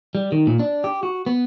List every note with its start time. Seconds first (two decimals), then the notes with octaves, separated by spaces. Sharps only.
0.15 G3
0.32 D#3
0.47 A#2
0.59 D4
0.84 G4
1.03 F#4
1.26 B3